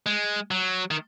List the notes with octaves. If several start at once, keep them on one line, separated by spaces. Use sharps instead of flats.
G#3
F#3
D#3